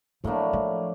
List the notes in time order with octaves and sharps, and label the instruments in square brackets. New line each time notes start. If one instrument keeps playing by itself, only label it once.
[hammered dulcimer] A2 F#3 A#3 D4 [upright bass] F3
[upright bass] F3